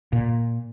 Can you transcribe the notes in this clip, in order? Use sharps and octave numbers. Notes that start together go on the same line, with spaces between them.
A#2